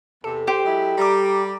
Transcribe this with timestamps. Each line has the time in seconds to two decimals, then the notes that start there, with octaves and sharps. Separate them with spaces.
0.24 E2 C3 A4
0.47 G4 C5
0.65 F#3 G#3 E4
0.97 G3 A#5 D6